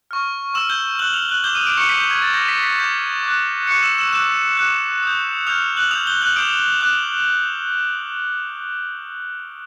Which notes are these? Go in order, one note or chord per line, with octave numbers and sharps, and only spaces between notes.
C#6 F6
C#6 E6 F6 E7
G6 G7
C#6 F6 F#6 F#7
F6 F7
F#6 F#7
D6 G6 G7
D#6 D#7
D6 D7
C#6 C#7
D6 G6 B6
G6
G#6
A6
D6 G6 A#6
B6
B6
D6 G6 B6
D6 F#6
C#6 D6 F#6 C#7
E6 E7
E6 E7
D6 E6 F#6 E7
D6 F#6
D#6 G6
D#6 F6 G6 F7
F#6 F#7
D#6 F6 G6 F7
G6 G7
F#6 F#7
D6 D#6 G6 D7
D6 F#6